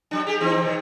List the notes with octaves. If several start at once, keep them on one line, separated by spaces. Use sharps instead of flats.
F#3 D4
G4 G#4
E3 C4 D#4
D#2 C3 F#3